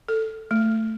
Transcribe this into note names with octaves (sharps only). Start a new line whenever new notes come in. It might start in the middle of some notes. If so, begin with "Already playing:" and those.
A4
A3